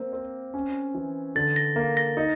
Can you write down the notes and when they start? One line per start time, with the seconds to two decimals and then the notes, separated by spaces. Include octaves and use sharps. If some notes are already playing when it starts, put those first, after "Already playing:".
Already playing: A#3 C4
0.13 C4
0.54 C#4
0.94 E3
1.35 D3 A6
1.56 A#6
1.76 A#3
1.97 A#6
2.17 D#4